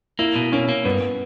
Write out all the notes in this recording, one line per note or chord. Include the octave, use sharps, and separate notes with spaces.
A#3 E4
B2
A#3 C#4
A#3
G2 B3